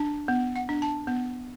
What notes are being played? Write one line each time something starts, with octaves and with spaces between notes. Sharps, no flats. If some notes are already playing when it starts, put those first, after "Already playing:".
Already playing: D4 A5
B3
F#5
D4
A5
B3